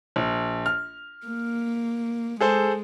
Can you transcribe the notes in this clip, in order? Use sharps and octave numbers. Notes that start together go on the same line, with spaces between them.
A#1
F6
A#3
G#3 G#4 A4 C5